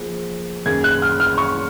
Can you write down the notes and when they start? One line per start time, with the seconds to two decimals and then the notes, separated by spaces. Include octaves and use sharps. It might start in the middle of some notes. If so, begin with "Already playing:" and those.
Already playing: F3 A#3 F4 G#4 C5
0.66 F#2 D#3 A#3 C#4 G#4 G#6
0.84 F#6
1.02 F6
1.20 F6
1.38 C#6